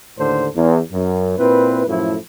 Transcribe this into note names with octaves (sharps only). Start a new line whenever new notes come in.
D#2 A2 D3 A4 C5
E2
F#2
A#2 C4 E4 B4
F#2 A2 F3 A3 E4